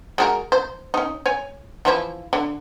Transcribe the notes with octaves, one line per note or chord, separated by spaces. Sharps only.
G#3 F#4 A#4
C5
C#4 D#4
C#5 G#5
E3 F3 E4
D3